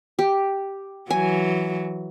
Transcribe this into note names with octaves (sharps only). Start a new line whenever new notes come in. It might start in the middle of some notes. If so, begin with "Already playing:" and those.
G4
E3 F#3 G#5